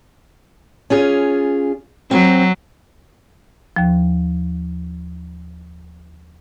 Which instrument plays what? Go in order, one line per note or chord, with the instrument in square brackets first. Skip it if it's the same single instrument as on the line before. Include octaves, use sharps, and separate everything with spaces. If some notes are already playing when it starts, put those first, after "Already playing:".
[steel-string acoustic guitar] C#4 F4 G#4
[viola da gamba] F#3 [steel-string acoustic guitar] C4
[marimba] D#2 F3